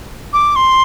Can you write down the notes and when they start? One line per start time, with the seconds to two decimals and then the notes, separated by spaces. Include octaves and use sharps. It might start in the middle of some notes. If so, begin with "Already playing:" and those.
0.33 D6
0.56 C6